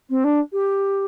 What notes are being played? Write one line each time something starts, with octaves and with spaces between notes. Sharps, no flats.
C4
D4
G4